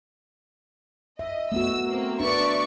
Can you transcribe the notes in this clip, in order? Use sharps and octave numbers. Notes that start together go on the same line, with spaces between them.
D#5 E5
A3 B3 F#4 E6
A#3 C4
D4 B4 D5 E5 C#6